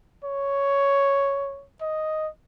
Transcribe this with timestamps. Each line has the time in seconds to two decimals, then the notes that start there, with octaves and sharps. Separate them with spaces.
0.24 C#5
1.81 D#5